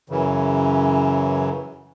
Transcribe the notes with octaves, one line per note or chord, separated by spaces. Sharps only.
F#2 C#3 E3